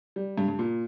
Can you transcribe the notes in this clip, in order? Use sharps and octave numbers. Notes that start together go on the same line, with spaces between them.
G3
G2
G2
A#2